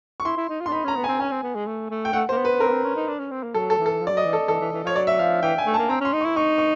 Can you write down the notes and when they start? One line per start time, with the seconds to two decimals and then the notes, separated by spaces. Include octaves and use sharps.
0.20 C#6
0.25 E4 C6
0.37 E4
0.49 D#4
0.61 F4
0.66 D4 C6
0.72 D#4 B5
0.84 C#4 A#5
0.96 B3
1.04 G#5
1.08 C4
1.20 C#4 G#5
1.31 C4
1.43 B3
1.55 G#3
1.66 A3
1.90 A3
2.05 G5
2.13 A3 F#5
2.29 C5
2.32 A#3
2.37 B3
2.45 B4
2.48 B3
2.60 C4 A#4
2.68 B3
2.72 C4
2.84 C#4
2.96 D#4
3.08 D4
3.19 C#4
3.31 C4
3.43 A#3
3.54 F#3 A4
3.70 A4
3.78 E3
3.86 A4
4.01 F3
4.07 G3 D5
4.13 F#3 D#5
4.25 E3
4.33 A4
4.48 E3 A4
4.60 E3
4.73 E3
4.84 F3 C#5
4.95 F#3 D5
5.07 E5
5.19 F3 F5
5.42 E3 G5
5.58 G#5
5.66 A3
5.74 A5
5.78 A#3
5.89 C4 A#5
6.01 C#4 C6
6.13 D#4
6.21 C#6
6.25 E4
6.36 D#4 C#6
6.58 C#6